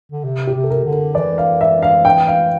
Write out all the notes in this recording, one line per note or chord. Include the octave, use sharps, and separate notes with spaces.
D3
C3
G4
C3
A4
A#4
D3
A#4
E3 D5
F5
E5
F5
G5
F5